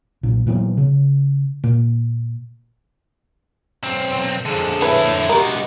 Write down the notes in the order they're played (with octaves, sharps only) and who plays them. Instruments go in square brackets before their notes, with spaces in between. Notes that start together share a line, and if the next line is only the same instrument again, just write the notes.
[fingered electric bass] B1 A#2
A#2 E3 F#3 B3
C#3
A#2
[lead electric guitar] B1 C4
[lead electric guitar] F2 D3 [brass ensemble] G#4
[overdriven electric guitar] E4 C#5 [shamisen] B4
[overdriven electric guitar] G#3 B3 [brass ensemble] F#4 G4 [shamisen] A#4